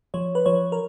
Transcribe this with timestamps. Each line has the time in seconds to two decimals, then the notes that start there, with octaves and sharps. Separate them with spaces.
0.14 F3 C#5
0.35 B4
0.46 F3 C#5
0.72 A#4